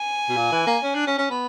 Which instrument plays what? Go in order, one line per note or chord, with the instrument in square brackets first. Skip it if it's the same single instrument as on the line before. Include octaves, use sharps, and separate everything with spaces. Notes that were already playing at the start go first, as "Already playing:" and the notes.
Already playing: [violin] G#5
[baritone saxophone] B2
A#2
E3
A#3
C#4
D4
C#4
C#4
B3